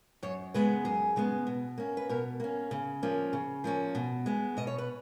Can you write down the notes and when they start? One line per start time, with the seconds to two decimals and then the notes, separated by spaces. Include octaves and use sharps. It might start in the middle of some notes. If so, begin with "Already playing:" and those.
0.23 F#2 C#5
0.54 C#3 G#3 B3 B4
0.85 F#2 G#4
1.16 C#3 G#3 B3
1.47 B2
1.78 A#3 C#4
1.97 B4
2.09 B2 A#4
2.40 A#3 C#4
2.71 C#3
3.03 F3 A#3 C#4
3.33 C#3
3.64 F3 A#3 C#4
3.95 B2
4.26 G#3 B3
4.57 B2 D#5
4.67 C#5
4.78 B4